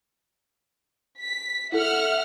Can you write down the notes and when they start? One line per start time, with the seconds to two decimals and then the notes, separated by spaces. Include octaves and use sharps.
1.21 B6
1.72 E4 A4 E5 F#5 F6